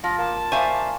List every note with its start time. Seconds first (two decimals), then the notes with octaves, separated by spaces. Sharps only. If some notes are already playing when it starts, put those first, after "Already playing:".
0.04 F3 F4 A#6
0.18 A#3 A5
0.52 A#3 C5 D5 E5 F5 G#5 C#6